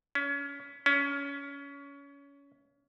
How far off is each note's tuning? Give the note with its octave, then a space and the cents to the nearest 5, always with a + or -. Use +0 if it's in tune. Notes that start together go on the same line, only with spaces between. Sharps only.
C#4 +30
C#4 +25